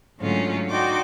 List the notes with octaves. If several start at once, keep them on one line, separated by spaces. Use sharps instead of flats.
G#2 D3 F#3 A3 C#4 F4
D#4 F#4 D5 G5 C6 D6